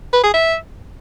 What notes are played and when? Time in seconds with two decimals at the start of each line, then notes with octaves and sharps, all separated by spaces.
0.13 B4
0.23 G#4
0.34 E5